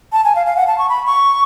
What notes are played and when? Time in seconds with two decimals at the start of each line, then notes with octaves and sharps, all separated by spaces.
0.12 A5
0.24 G#5
0.35 F5
0.46 F5
0.57 F#5
0.67 A5
0.78 C#6
0.89 B5
1.06 C#6